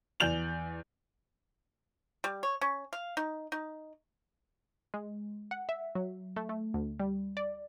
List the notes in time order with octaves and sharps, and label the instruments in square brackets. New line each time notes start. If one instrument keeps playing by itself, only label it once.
[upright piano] E2 D5 G6 F7 F#7
[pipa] G3
C#5
C#4
F5
D#4
D#4
[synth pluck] G#3
F#5
E5
F#3
A3
A3
D2
G3
D5